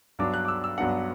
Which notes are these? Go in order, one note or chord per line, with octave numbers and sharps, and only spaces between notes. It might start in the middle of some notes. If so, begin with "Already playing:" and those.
G2 F#3 B3 D4 D6
F#6
D6
E6
E6
G2 F#3 B3 D4 F#5